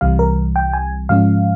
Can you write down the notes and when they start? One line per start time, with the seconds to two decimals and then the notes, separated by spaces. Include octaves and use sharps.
0.01 C2 C3 E3 G3 F5
0.19 A#4
0.56 G5
0.74 G#5
1.09 G#2 F3 G#3 C#4 F5